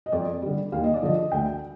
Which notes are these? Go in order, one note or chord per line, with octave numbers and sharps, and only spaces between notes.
D#5
F2 D5
D3 G3
D#2 F5
D#5
D5
D3 F3 D#5
D2 G5